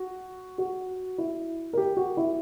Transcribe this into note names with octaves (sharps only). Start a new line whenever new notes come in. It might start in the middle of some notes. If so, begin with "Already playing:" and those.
Already playing: F#4
F#4
E4
A#4
G4
F#4
E4